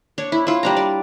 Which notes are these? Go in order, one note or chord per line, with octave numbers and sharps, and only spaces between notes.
D4 C#5
E4
E4 F4
G3 D4 A#5
D5